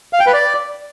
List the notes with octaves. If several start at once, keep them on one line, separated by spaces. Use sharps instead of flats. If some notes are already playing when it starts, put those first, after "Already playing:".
F5
G5
B4
D5